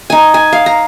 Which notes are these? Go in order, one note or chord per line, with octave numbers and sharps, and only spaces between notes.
D#4 G#5
G#5
F5
A#5